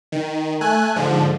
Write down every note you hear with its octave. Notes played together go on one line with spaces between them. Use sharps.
D#3
A3 G#5 F#6
G#2 D3 F3